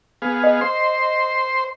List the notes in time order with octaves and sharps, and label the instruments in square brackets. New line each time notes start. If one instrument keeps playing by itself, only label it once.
[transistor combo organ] B3 G#4 F5
[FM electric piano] D#5
[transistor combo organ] C5 C6